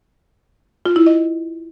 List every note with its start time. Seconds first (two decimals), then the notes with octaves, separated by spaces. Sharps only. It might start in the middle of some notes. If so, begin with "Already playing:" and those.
0.86 F4
0.96 E4
1.06 D#5